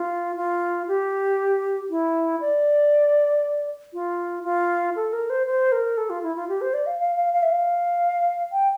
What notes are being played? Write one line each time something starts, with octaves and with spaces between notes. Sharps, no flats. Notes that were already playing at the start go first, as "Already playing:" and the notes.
Already playing: F4
F4
G4
E4
D5
F4
F4
A4
A#4
C5
C5
A#4
A4
F4
E4
F4
G4
C5
D5
F5
F5
F5
F5
E5
F5
G5